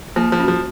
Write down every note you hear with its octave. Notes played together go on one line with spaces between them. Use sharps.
F3 A#3
F3
C#4 F#4
F3